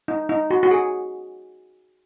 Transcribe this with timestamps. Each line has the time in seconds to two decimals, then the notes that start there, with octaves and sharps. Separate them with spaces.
0.08 D#4
0.29 D#4
0.50 F#4
0.63 F#4
0.71 G#4